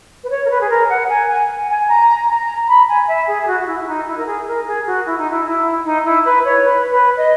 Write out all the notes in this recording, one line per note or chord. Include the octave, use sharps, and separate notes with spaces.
B4
C#5
A#4
B4
G#4
A#4
F#5
G#5
G#5
G#5
A#5
A#5
B5
G#5
E5
G#4
G#4
F#4
F#4
E4
E4
D#4
E4
A#4
G#4
A#4
G#4
F#4
E4
D#4
E4
E4
D#4
E4
B4
C#5
B4
B4
D#5